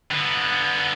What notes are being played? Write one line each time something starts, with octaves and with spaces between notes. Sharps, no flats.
D3 B3